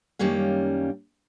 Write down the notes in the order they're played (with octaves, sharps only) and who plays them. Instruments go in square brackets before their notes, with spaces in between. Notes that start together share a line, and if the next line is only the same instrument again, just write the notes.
[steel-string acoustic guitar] F#2 D#3 G3 A#3 C#4 F5